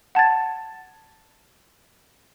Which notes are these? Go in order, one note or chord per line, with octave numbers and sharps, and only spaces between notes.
F#5 A5 G#6 A6